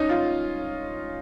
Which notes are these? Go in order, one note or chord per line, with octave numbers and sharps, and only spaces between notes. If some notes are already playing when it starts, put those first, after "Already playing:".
Already playing: C#4 D#4
F4